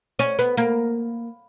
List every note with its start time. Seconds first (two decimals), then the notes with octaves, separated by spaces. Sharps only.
0.19 C#4
0.39 B3
0.57 A#3